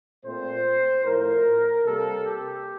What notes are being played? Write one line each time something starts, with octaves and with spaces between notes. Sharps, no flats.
A#2 A3 C4 C5
A2 F3 A3 A#4
C3 G3 A#3 A4
G4